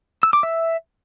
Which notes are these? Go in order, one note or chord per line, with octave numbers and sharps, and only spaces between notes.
E6
D6
E5